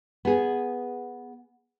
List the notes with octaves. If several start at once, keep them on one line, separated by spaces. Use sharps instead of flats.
B3 G#4